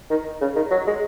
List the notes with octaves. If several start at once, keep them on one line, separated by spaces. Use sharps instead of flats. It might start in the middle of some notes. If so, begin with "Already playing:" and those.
D#3
C#3
D#3
F#3
G#3